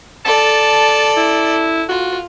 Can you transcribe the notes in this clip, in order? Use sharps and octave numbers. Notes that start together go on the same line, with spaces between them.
A4 D5 A5
E4
F4 F#4